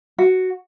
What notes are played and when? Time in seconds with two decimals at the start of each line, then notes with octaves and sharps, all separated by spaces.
0.18 F#4